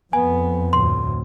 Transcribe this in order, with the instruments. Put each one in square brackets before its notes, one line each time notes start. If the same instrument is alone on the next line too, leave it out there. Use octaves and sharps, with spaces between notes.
[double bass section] F2 [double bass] B3 [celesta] G#5
[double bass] D2 A2 [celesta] C6